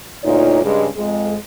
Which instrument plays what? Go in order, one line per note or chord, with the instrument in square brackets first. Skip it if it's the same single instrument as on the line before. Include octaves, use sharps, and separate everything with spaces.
[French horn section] D2 A#2 D#4 F4 C#5
G2 C#3 G#3
F2 G#3